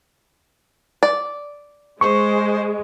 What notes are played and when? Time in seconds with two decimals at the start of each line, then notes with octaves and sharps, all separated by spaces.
1.03 D5
2.01 G#3 C5 C#6